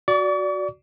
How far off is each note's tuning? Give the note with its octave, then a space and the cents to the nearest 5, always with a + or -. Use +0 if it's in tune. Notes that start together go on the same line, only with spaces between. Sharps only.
F#4 +0 D5 -10 C#6 +45